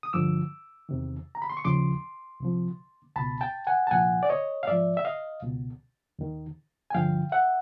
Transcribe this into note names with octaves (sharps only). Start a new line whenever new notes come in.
D#6
G2 D3 F3 D6 E6
E2 C3 D#3
A#5
B5
C6
C#6
D#2 C#3 F3 C6 D6
C2 C3 F3
C#2 B2 A5 B5
G5 A5
F#5 G#5
A5
C2 A#2 F3 F#5 G#5
D5
C#5 D#5
F5
G#2 F3 D5 E5
E5
D#5 F5
C#2 B2
D#2 D#3
G#5
G2 D3 F3 F5 G5
E5 F#5